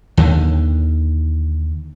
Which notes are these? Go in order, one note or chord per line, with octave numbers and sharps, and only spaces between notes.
D#2 D3 D#3